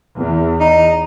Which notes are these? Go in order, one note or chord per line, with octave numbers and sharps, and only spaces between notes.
E2
D#4